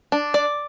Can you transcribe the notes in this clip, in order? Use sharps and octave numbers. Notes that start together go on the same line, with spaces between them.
D4
D5